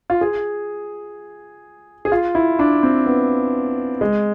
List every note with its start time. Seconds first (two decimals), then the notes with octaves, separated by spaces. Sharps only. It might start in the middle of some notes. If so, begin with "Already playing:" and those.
0.10 F4
0.21 G#4
2.05 G#4
2.12 F4
2.35 E4
2.59 D4
2.83 C4
3.06 B3
4.01 G#3